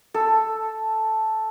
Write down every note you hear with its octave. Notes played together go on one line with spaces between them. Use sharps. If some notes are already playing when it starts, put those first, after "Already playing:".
A4